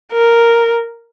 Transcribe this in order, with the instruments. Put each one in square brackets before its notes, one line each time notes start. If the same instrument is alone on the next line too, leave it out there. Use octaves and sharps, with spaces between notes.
[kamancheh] A#4